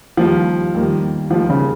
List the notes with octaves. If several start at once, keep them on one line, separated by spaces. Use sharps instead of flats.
D#2 D#3 F3 G3 A#3
D#2 D#3 G3 A#3
D#2 D#3 F3 G3 A#3
C#3